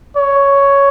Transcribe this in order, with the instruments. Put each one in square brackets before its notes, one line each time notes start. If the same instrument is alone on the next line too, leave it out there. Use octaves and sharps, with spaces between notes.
[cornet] C#5